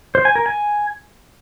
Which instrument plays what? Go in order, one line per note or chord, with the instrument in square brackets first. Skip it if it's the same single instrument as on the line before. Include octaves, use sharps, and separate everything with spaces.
[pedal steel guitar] C5
G#5
A#4
G#5